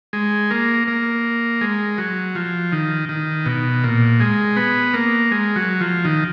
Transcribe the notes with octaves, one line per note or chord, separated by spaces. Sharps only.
G#3
A#3
A#3
G#3
F#3
F3
D#3
D#3
B2
A#2
G#3
B3
A#3
G#3
F#3
F3
D#3